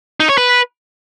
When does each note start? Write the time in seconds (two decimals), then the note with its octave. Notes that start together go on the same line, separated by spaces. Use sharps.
0.20 D#4
0.29 C#5
0.38 B4